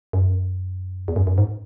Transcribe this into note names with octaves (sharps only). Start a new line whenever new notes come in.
F#2
E2
F#2
F#2
G#2